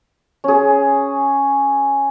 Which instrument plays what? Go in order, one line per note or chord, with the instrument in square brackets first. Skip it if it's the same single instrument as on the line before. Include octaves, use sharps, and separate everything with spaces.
[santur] C#4 G#4